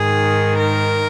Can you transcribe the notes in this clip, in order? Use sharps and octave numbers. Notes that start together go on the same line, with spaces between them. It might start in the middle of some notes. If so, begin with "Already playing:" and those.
Already playing: G#2 D#3 G#4
A#4